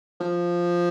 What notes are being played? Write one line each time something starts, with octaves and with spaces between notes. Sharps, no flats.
F3